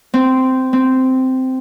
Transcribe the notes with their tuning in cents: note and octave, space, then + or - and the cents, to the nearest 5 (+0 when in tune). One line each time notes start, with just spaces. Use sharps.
C4 -10
C4 -10